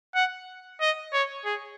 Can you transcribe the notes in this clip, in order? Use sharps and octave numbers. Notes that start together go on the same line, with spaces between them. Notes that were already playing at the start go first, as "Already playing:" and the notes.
F#5
D#5
C#5
G#4